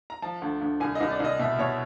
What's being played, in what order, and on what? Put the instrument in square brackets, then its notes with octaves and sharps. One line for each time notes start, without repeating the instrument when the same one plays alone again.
[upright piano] A#5
F3 A5
D2
D2
C2 G#5
D#5
C2
D5
C2 D#5
B2 E5
B2 C#5